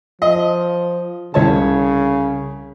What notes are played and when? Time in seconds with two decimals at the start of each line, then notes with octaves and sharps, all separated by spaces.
0.22 F3 D#5
1.34 C2 C#3 C#5 A5